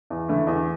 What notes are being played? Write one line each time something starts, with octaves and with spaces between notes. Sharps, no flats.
E2
D3 A3 E4
E2